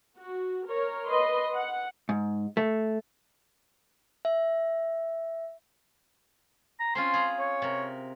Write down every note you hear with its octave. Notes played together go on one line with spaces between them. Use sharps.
F#4
A#4 C#5
B4 D#5 C6
F#5
G#2
A3
E5
A#5
C4 C#4 F4 C6
G#4 A#5 B5
C#5
C3 A#4